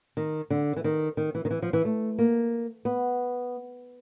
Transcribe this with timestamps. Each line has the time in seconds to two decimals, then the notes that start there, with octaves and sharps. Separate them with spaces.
0.17 D#3
0.50 D3
0.76 E3
0.84 D#3
1.17 D#3
1.35 E3
1.45 D#3
1.51 E3
1.62 F3
1.73 E3
1.85 A3
2.19 A#3
2.85 B3